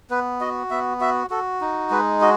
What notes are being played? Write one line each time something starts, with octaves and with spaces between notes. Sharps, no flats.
B3 B4
F#4 D#5
B3 E5
F#4 E5
F#4 A4
D#4
G#3 B4
F#4 D#5